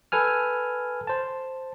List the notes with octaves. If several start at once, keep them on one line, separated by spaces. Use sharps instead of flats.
A4 B4 G#5 F6
C5 A5